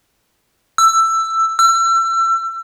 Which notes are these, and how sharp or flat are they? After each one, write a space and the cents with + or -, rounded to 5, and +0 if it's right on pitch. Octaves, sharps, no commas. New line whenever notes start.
E6 +10
E6 +35